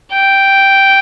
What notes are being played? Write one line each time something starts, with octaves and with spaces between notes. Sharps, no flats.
G5